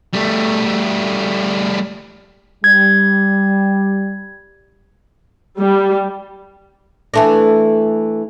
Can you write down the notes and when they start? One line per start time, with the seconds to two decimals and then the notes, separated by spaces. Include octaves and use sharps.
0.14 G3 A3
2.64 G3 G#6
5.59 G3
7.14 E3 A3 D4